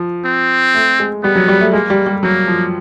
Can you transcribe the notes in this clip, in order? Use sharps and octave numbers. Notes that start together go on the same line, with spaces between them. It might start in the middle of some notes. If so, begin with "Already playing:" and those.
Already playing: F3
C4
A3
G#3
G3 B3
F#3
G3
A3
G#3 A#3
G3
G3
F#3 A#3
F3